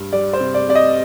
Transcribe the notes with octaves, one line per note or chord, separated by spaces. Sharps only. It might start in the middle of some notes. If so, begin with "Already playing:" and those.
Already playing: G2
G3 D5
C5
C3
D5
C3 D5
D#5